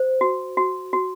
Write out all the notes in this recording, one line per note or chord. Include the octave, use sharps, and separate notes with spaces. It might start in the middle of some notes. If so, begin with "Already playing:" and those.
Already playing: C5
F#4
F#4
F#4